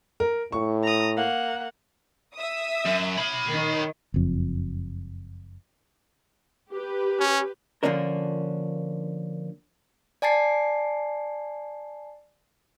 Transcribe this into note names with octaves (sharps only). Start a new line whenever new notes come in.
A#4
A2 C#6
A#5 D#6
A#3 F#5
E5 D#6
F#2
C#5 B5
D#3
F#1 F2
G4 B4
C#4
D3 F3 A#3 C#4 D4 A#4
D5 G#5 A5 A6 C7